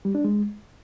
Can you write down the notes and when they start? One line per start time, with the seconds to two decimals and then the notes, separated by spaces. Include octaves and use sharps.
0.05 G3
0.15 D4
0.24 G#3